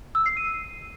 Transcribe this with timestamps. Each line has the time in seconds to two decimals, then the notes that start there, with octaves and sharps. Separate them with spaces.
0.15 E6
0.26 C7
0.37 D#7